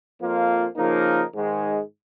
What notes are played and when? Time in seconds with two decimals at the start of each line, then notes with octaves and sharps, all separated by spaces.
0.20 F2 F3 A#3 F4
0.77 C#3 F3 A#3 D#4 A#4
1.34 G#2 D#3 G#3